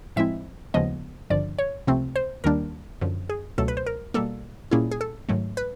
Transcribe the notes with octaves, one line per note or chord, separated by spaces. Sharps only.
A2 F3 G#3 C4 E4 E5
D#2 C#3 F3 G#3 B3 D#5
G#1 G2 D3 F3 D5
C#5
C#2 C3 F3 A3 C4
C5
D#2 D#3 G3 A#3 D4 A#4
F#2 D3 F3
G#4
C#2 B2 F#3 A3 A4
B4
C5
A#4
B2 G3 A#3 A4
A#2 G3 A#3 C#4 E4 G#4
G#4
A4
G#2 D#3 F#3 A3
B4